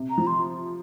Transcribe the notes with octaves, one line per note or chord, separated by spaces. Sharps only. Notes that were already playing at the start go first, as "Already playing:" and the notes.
Already playing: C3
A#5
F3
C6